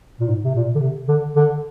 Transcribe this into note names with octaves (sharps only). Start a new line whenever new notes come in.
A#2
G#2
C3
A#2
D3
C3
D3
D3